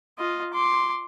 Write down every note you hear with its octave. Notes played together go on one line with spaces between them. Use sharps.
F4 D#5
C6 D6